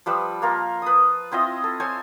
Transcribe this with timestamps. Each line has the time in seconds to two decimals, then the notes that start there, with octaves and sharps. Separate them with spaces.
0.06 F3 G3 B4 E6
0.42 A#3 F4 A#4
0.82 B4 D#6
1.32 C4 E4 F4 D#5
1.64 A4
1.80 A4 C5 C#5 G#5